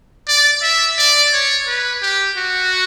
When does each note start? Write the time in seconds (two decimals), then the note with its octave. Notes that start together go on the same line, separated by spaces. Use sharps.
0.28 D5
0.62 E5
0.98 D5
1.33 C#5
1.67 B4
2.02 G4
2.37 F#4